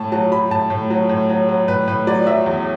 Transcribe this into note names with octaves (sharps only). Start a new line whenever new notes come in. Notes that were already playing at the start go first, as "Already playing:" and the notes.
Already playing: A2 A5
F#3 A5
F#3 B5
A2 A5
A2
F#3
A2
F#3
F#3
A2 B4
A2 B4
F#3 D5
F#3 E5
E2